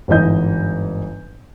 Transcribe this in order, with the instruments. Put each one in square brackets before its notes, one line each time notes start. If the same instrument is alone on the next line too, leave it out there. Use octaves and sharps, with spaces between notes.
[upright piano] G1 G#2 E3 D#5 G6